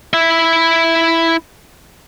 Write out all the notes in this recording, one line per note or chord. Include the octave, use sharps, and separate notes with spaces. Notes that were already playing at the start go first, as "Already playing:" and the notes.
E4 E5